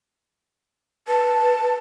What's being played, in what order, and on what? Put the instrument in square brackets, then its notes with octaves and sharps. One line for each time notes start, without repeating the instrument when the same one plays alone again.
[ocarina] B4 [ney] A5